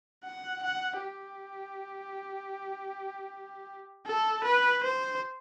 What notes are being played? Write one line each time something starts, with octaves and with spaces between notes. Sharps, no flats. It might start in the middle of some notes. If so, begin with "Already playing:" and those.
F#5
F#5
G4
A4
B4
C5